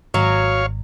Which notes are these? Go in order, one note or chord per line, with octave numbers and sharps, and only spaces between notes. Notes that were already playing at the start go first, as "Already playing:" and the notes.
G#1 F#3 C#5 F5